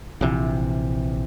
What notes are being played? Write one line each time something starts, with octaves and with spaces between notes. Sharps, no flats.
A#1 C3 E3